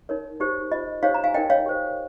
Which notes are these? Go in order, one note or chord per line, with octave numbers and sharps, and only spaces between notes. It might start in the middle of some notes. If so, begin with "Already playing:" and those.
D#4 A#4 C#5
D#4 G4 C5
F4 C5 D#5
D#4 G4 C5 C#5 F5
A#5
F5 G#5
D#4 A#4 C#5 D#5 G5
C#5 F5
G4 C5